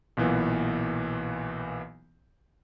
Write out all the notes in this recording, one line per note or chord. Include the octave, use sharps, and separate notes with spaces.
B1 A#2 E3 B3